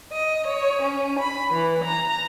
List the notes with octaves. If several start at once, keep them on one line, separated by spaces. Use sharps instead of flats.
D#5
C#5
C#4
B5
E3
A#5